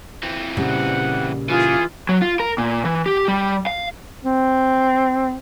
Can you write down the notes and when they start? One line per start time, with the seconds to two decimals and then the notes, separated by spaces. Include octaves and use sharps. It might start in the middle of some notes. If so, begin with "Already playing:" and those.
0.23 E3 C4
0.57 A#2 C#3 G3 F#5
1.49 E3 F4 G#4
2.09 F#3
2.22 F4
2.40 A#4
2.58 A#2
2.85 E3
3.06 G4
3.28 G3
3.67 F5
4.24 C4